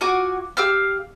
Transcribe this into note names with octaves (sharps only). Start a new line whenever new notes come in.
F4 F#4 G#5 D6
G4 F5 E6 F6